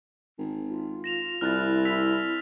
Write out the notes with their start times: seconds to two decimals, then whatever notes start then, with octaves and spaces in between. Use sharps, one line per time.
0.38 G#1
0.69 F4
1.04 A#6 E7 F7
1.41 C2 E4 F6 F#6 A6
1.85 E6 B6 F7